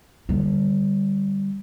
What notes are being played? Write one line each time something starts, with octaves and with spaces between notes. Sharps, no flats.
D3 G3